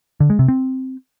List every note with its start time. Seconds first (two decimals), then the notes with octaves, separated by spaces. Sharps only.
0.20 D3
0.30 G#3
0.39 C3
0.48 C4